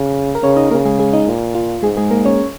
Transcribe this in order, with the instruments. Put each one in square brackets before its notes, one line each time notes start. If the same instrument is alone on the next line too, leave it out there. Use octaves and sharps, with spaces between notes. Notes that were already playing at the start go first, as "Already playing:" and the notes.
Already playing: [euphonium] C#3
[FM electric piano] A#4
[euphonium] C#3 [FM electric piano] C#4 C#5
[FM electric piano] D#4 D#5
[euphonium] C#3 [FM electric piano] A#3 A#4
[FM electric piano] G#3 G#4
G#3 G#4
D#4
[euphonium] A#2
[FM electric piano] F4
[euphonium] G#2 [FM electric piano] G#3 G#4
[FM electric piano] G#3 G#4
A#3 A#4
C#4 C#5